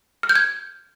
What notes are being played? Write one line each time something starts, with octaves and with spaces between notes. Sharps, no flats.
F6
G6
G#6